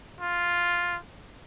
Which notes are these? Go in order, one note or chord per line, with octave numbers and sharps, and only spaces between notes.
F4